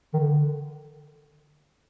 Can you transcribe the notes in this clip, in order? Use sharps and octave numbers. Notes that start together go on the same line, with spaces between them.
D#3
D3